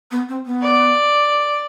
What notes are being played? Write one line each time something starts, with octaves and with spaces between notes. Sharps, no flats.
B3
C4
B3
D5